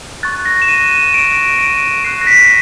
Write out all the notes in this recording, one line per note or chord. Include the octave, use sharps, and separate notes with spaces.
C#6 F#6 A6
A#6
E7
D#7
D#7
C#6 F#6 D7
D7
C#6 F#6 C7
A#6
B6